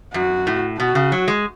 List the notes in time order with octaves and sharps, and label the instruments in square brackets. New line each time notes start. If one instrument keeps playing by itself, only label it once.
[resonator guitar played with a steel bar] F#2 [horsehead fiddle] F#4
[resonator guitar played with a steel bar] A2
[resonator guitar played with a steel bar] B2 [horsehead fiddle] F#4
[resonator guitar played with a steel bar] C#3
F#3
G#3